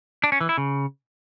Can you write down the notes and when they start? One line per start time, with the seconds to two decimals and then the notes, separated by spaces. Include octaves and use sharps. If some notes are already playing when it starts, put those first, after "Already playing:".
0.24 D4
0.32 C#4
0.41 E3
0.49 E4
0.58 C#3